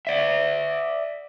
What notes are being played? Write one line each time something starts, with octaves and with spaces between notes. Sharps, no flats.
D5 E5